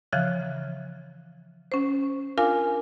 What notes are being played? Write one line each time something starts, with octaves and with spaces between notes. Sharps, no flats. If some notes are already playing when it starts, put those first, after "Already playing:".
C#3 E3 F3 F5 F#6
C#4 C5
D4 F4 A#4 F5 G#5